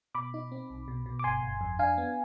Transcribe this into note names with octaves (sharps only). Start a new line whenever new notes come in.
B2 B5 D6
D#4
C4
B1
B2
B2
D6
G1 G#5 C6
G1
F2
D4 F5 G#5
B3